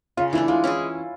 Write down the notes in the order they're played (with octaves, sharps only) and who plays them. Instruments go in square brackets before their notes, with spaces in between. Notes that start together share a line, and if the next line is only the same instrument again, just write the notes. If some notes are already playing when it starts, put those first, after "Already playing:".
[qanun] C#3 [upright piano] F4
[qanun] E3 A3 D4 [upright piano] E4
[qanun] G#3 [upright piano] F4
[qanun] C#4 E4 G#4